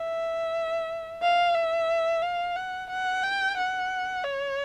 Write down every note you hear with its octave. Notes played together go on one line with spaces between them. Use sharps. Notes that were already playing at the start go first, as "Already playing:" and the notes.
Already playing: E5
F5
E5
F5
F#5
F#5
G5
F#5
C#5